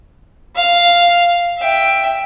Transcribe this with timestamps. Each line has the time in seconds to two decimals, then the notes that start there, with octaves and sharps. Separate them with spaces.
0.55 F5
1.58 E5 G5